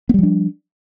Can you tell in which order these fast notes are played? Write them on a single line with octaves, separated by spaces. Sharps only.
B3 G3 F3 D4